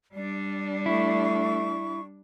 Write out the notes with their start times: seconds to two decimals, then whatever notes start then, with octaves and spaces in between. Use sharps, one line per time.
0.14 G3 D4 D5
0.86 A3 E4 C#6